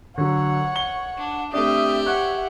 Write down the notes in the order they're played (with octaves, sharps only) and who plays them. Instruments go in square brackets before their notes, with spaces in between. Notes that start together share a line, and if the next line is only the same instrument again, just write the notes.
[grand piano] D3 F#3 [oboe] C#5 [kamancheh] F#5
[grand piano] G7
[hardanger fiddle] D4
[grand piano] A3 C4 D4 [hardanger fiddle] G4 [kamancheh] E5 [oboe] D#6
[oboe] C#5 [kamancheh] E5 F#5 [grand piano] F#6